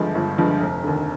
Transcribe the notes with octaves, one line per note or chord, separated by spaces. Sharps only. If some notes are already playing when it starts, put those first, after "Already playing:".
Already playing: G1 G2 D3 F3 G#3
G1
G2 D3 F3 G#3
F1
D#2 D3